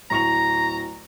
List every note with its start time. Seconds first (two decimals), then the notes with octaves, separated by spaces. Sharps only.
0.10 D1 A#5 C#6 F7